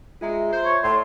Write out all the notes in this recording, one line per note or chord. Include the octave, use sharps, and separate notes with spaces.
G#3 F4 E5 A#5
C5
C#5
A2 D5 C6